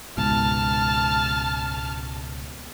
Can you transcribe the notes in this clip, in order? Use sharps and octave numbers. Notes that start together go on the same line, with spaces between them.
C#2 G#2 B2 A5 F6